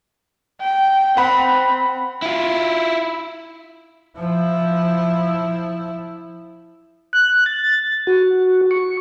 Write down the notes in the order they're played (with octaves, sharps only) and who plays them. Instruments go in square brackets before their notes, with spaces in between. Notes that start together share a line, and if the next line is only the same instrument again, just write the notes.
[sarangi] G5
[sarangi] C4 [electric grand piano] F#5 B5
[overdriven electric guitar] E4 F4
[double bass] F3 E4
[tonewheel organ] F#6
A6
F#4
C#6